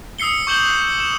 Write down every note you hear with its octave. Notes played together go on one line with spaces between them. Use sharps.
D#6 E6 C7 C#7 G7
C#6 D6 G6 E7 F#7 G7
F#6 C7
E7